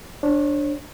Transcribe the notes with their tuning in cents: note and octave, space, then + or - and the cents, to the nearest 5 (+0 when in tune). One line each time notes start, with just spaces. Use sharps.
D4 +0 C#5 -40